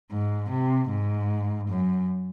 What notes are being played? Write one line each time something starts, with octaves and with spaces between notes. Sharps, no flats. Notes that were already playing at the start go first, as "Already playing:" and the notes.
G#2
C3
G#2
F#2